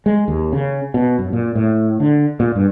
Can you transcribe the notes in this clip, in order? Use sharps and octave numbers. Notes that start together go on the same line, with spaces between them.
G#3
D#2
C#3
B2
F#2
A#2
A2
D3
A#2
G2